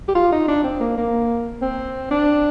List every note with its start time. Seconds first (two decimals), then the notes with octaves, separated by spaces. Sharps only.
0.09 G4
0.15 F4
0.32 D#4
0.48 D4
0.64 C4
0.80 A#3
0.97 A#3
1.62 C4
2.11 D4